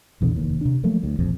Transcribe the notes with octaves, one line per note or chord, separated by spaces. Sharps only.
A#1 E2 B2 D3
F1 D#2
C3 D4
F3 F#3 A3 A#3
D2
E1 A#1 F2